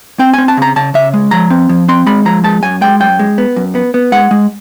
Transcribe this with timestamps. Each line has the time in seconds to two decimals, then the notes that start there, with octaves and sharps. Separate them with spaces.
0.19 C4 G5
0.34 C4 G#5
0.48 A5
0.57 C#3 A#5
0.76 C#3 A5
0.94 C#3 E5
1.14 G#3
1.31 F3 A#5
1.50 C4
1.69 F3
1.88 C4 C6
2.06 G#3 B5
2.25 F3 A#5
2.44 G#3 A5
2.62 F#2 G#5
2.81 G#3 G5
3.00 F#2 G5
3.19 G#3
3.38 B3
3.56 F#2
3.75 B3
3.94 B3
4.12 G#3 F#5
4.31 G#3